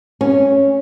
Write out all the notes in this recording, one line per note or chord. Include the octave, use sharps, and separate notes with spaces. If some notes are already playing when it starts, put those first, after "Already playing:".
C#4